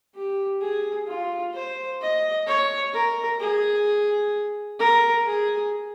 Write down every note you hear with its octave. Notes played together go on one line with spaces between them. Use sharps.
G4
G#4
F4
C5
D#5
C#5
A#4
G#4
A#4
G#4